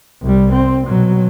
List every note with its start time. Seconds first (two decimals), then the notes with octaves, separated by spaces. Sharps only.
0.22 C2 G3
0.52 C4
0.86 B2 F#3